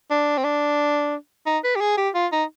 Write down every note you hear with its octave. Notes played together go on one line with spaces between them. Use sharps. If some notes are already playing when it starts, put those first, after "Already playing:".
D4
C4
D4
D#4
B4
G4
G#4
G4
F4
D#4